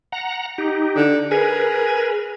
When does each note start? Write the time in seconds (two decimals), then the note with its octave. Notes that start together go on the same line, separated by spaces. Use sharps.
0.12 F#5 A#5
0.58 D#4 G4
0.96 D3
1.31 G#4 A#4 B4